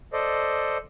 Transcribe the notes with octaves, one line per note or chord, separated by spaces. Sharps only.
A4 C5 D5 D#5